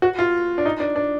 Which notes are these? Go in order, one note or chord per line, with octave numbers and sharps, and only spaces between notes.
F#4
F4
D4
D#4
D4
D4